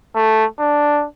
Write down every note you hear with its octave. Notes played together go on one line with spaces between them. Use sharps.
A3
D4